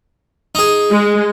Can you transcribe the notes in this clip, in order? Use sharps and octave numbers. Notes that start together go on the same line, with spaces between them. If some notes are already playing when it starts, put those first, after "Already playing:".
D#4 G#4
G#3